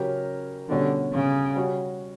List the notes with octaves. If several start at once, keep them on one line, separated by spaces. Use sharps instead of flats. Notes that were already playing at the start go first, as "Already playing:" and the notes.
Already playing: C#3 F#3 C#4 G4 A#4
B2 D3 G3 C#4 F#4
C#3
G3 C#4 F#4